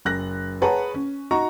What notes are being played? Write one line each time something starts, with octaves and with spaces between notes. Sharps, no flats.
F#1 F#6 A#6
G#4 B4 C#5 F#5 A5 A#5
C#4
D#4 F#4 A#5 C#6